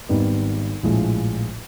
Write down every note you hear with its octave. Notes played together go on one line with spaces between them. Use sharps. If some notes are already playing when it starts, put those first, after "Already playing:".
G#1 G#2 D#3 G3 B3
A#1 A2 F3 G#3